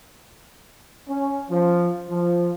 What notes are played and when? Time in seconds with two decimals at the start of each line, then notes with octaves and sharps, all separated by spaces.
1.08 C#4
1.49 F3
2.09 F3